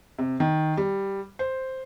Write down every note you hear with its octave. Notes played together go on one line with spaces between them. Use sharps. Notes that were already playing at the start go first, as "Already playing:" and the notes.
C3
D#3
G3
C5